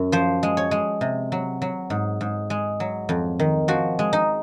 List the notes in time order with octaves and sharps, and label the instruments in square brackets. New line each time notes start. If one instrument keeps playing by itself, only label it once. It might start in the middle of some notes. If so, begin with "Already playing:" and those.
Already playing: [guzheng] F#2
F3 C5
G#3
C#5
G#3
C3
F#3
F#3
G#2
G#2
G#3
F#3
F2
D#3
F3 F#4
G#3
D#4